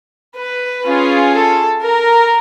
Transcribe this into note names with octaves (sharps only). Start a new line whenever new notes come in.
B4
C#4 F4 G#4
A4
A#4